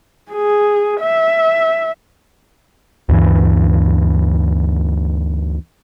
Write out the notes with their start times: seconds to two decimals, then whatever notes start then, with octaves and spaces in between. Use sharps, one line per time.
0.32 G#4
1.01 E5
3.09 D2 G2 E3